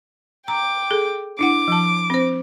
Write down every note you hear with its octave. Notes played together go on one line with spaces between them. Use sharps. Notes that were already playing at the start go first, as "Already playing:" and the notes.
G5 A#5 D6
G#4 A4
D4 E4 F#5 D6
F3 A5
C4 C5